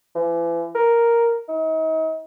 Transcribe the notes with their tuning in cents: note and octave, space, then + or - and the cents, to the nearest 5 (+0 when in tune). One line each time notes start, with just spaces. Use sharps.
E3 +35
A#4 +0
D#4 +40